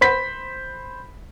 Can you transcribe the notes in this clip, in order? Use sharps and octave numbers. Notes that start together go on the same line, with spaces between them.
C5 B5 B6